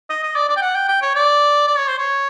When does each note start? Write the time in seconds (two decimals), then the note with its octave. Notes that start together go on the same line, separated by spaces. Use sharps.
0.10 D#5
0.23 D#5
0.35 D5
0.48 D5
0.56 G5
0.62 F#5
0.75 G5
0.88 G5
1.02 C#5
1.15 D5
1.67 D5
1.77 C#5
1.88 C5
1.98 C#5